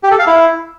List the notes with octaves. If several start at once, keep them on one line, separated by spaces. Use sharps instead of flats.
G4
A4
F5
E4